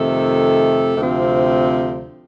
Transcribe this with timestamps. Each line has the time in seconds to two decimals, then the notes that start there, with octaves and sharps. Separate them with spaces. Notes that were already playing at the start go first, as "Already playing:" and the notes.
Already playing: F2 C3 D#3 A3 A4
0.97 D2 C3 F3 C4